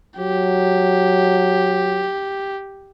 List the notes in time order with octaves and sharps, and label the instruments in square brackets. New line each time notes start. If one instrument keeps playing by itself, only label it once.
[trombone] F#3 [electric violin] G4